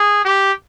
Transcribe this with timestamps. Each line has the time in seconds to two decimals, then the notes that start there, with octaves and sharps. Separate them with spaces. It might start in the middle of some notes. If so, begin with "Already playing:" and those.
Already playing: G#4
0.25 G4